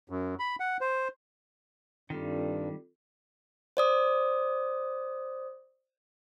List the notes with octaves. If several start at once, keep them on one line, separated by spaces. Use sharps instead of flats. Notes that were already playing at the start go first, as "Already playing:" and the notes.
F#2
B5
F#5
C5
G2 D#3 G3 C4 F4 A4
C5 D5 D#6